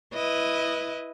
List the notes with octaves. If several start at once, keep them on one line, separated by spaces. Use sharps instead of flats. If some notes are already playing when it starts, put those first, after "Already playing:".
E4 B4 D#5